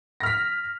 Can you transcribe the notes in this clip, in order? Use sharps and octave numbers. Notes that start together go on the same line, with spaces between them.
F6 A#6 B6